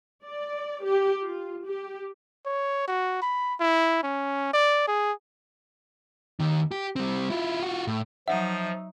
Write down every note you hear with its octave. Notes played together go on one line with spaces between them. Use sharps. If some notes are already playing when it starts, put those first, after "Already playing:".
D5
G4
F4
G4
C#5
F#4
B5
E4
C#4
D5
G#4
D#2 D#3
G4
G3 C4
E4 F4
F4 F#4
A2
F3 F#3 D#4 E5 F#5